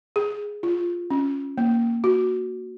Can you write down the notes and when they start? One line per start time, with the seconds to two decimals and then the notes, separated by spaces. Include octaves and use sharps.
0.16 G#4
0.63 F4
1.11 C#4
1.58 A#3
2.04 F#4